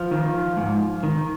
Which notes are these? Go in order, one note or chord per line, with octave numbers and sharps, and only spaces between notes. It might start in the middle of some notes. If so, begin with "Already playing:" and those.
Already playing: F3 F4
D#3
G#2
D#3